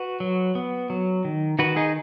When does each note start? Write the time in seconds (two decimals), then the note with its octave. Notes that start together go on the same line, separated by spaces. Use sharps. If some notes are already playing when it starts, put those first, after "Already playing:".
Already playing: F#4 B4
0.20 F#3
0.55 B3
0.90 F#3
1.25 D#3
1.59 D#3 F#4 B4
1.76 D#4 G#4